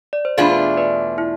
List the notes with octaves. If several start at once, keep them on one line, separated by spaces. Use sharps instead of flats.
D5
C5
E2 B2 A3 D4 F4 G#4 B4
G#4 B4
B4 D5
E4